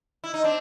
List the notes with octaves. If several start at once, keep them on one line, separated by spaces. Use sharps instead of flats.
E4
D#4
C4 D4